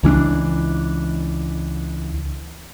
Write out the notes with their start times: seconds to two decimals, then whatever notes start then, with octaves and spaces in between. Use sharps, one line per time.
0.03 C#2 E3 C#4 D4